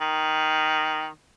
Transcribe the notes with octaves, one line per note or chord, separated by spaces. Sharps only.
D#3